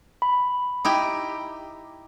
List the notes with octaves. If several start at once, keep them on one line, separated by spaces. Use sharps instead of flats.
B5
D#4 E4 G4